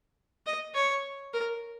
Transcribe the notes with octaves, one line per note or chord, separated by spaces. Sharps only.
D#5
C#5
A#4